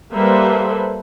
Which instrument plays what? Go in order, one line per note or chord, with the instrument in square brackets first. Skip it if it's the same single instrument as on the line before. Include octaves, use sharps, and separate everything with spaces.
[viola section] G3 A#3 A4 B4 C5 E5